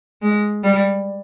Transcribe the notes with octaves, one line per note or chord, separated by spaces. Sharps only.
G#3
G3